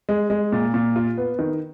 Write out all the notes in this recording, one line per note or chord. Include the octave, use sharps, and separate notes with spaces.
G#3
G#3
A#2
A#2
F4
B3
D#3